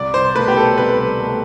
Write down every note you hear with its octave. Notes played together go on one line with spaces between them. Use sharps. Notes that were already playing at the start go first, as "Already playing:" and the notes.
Already playing: C2 D5
C5
B2 A3 B4
G4
A4
C2 B4
B2 A3